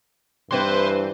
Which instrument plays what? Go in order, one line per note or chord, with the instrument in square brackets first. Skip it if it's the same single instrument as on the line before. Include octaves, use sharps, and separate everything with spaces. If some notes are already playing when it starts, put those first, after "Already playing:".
[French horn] G2 [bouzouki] E3 C4 E4 [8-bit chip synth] B4 C5 C6